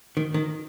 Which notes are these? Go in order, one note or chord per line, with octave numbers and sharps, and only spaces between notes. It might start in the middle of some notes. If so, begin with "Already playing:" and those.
D#3
D#3